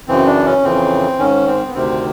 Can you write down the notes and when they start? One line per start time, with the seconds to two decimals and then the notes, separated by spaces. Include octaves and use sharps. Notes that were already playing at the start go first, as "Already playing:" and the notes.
0.08 F#2 C#3 E3 C4
0.26 D4
0.46 C#4
0.63 F2 C#3 E3 C4
1.19 G#2 D#3 C#4
1.46 C4
1.67 B3
1.74 D2 C3 D#3 C4